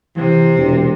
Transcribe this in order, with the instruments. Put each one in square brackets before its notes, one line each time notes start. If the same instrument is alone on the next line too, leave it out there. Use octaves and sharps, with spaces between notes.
[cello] C3 [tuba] E3
[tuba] E1